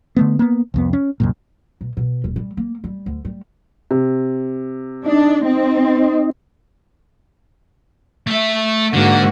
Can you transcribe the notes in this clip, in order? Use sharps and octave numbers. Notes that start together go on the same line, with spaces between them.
D3 A3 B3
A#3 B3
C2 F2 B3
C#4
C2 F#2 A#2
B2
B2
D#1
G3
A#3
G3
D2
G3
C3
D4 D#4
C4
A3 E5
G#2 D3 A#3 F#4